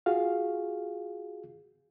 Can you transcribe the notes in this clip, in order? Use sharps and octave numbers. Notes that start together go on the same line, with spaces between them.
F4 F#4 G#4 F5